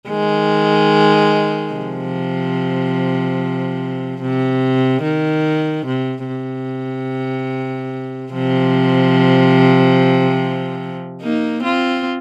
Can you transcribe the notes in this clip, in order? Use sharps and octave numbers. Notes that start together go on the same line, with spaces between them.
D#3 G#3
C3 F3
C3
D#3
C3
C3
C3 F3
A#3 D#4
C4 F4